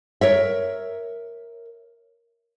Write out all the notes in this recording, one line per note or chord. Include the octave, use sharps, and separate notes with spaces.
A#4 C#5 E5